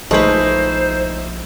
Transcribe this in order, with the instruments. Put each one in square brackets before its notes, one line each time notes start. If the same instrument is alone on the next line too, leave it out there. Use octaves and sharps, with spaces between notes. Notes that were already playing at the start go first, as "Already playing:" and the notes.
[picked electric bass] A#1 G#3 [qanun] A3 B4 [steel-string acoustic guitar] D#4 E4 [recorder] C5